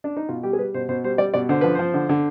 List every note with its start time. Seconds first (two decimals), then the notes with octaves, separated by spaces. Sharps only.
0.04 D4
0.17 D#4
0.29 B2 F4
0.43 G3 G4
0.53 G#4
0.58 G3 B4
0.74 B2 C5
0.89 B2 C5
1.04 G3 C5
1.18 G3 D5
1.34 B2 D5
1.49 D3 C5
1.61 F3 B4
1.75 F3 C5
1.94 D3
2.09 D3